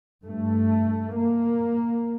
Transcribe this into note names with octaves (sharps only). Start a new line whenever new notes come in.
G2 A3
A#3